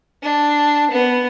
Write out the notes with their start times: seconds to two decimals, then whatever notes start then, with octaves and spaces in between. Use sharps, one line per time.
0.23 D4
0.91 B3